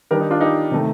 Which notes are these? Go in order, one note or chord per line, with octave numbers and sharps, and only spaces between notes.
D#3 G3 D4 G4 A#4
D#4
D4 F4
D#4 G4
C3 D#3 A3